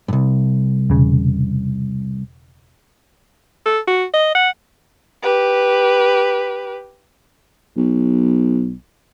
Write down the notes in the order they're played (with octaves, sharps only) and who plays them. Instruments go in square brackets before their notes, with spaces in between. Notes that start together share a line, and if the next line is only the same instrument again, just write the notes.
[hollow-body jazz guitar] C2 G2
[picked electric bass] E1 C#3
[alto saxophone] A4
F#4
D#5
F#5
[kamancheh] G4 B4
[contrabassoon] B1